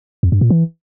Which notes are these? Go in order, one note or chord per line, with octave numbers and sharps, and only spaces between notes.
F2
G2
A#2
E3